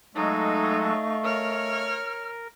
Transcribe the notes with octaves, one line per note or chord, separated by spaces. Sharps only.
F#3 G#3 A3 D#4 A4 D#5 F5 C#6
A#4 C#5 F6